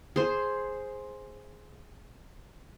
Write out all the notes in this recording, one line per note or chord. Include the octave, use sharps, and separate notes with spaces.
G#4 C5